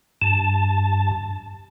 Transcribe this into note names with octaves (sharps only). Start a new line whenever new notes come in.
G2 A5